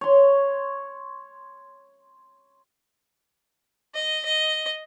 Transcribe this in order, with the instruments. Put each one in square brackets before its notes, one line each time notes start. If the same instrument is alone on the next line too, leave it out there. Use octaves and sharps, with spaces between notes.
[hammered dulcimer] C#5 C6
[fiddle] D#5
D#5